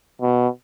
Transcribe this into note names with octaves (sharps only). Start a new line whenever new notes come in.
B2